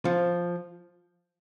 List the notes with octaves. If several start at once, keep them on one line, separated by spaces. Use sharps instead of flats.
F3